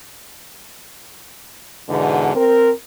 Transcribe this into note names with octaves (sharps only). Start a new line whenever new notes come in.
E2 G#2 B2 D3
C4 A#4